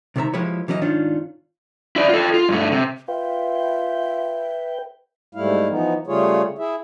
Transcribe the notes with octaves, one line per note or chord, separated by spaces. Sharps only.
C2 C3 D#3 D4 E5 A#5
F3 G#3 E4 G4 B4 C#5
E3 F#3 C#4 G4 D#5 E5
G#2 D#3 C#4 D4 F4
E4 D5
F4 A4
F4
G2 A3
C3
F4 B4 E5 G5
G#2 G3 A3 E4 F5
E3 F3 B3 D#4
C#3 G3 A3 F4 G#4 C#5
E4 G#4 E5